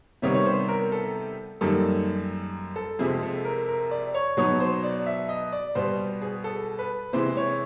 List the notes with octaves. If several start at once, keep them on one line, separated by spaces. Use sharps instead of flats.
C3 D#3 G3 B3 D#4 C#5
C#5
C5
A#4
A4
F#2 D#3 G3 A#3 D#4 A4
A4
F2 C3 F3 G#3 G#4
A4
A#4
A#4
D5
C#5
B2 F#3 B3 D#4 C#5
C5
D5
E5
D#5
D5
B2 G3 B3 C5
G#4
A4
B4
C3 E3 G#3 C5
C#5